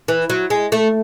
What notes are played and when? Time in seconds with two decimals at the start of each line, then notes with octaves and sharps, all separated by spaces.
0.08 E3
0.30 F#3
0.50 G#3
0.72 A3